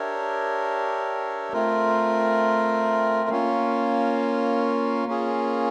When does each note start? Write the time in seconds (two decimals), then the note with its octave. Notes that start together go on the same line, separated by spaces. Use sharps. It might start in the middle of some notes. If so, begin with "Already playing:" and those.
Already playing: D4 G4 A#4 C#5 E5
1.53 A3 C4 F4 A#4
3.29 A#3 C#4 F4
5.07 A#3 C#4 F4 G#4